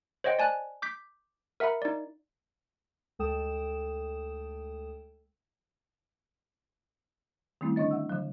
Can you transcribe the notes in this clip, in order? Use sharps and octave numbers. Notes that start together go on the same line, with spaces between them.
C5 C#5 D#5 F#5 G5
D5 G#5 A5 F#6
D6 G6 B6
A#4 E5 F#5 A#5 B5
D#4 D5
D2 G#3 A4 G5 D#6 E7
D#3 G3 A3 C4 C#4 E4
D3 D4 C#5 D#5 A6
E5 F#5 E6
D3 F3 F#3